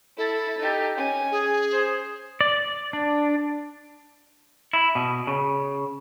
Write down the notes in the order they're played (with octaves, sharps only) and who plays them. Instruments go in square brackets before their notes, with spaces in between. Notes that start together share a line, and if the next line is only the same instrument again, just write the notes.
[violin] E4 [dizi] A4
[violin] D#4 G4
C#4 G#5
[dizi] G#4
[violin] C5
[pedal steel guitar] D5
D4
[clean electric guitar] E4
B2
C#3